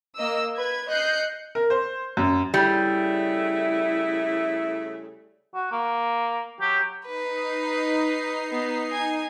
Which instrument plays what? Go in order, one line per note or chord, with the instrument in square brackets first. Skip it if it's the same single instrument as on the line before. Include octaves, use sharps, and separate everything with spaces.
[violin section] A#3 D#5 E6
B4 G#6
D#5 F#6 G6 C7 C#7
[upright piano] A#4
C5
F#2
[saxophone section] C#3 A3 E4 [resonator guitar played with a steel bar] G3
[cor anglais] F#4
A#3
[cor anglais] F#3 [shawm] G4
[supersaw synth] D#4 C7 [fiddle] B4
[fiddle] B3
G#5